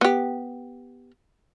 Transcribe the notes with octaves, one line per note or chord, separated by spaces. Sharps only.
B3 G4